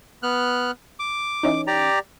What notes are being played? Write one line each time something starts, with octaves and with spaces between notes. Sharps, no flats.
B3 F6 F#6
D6
E3 C#4 D#4
G4 D5 A#5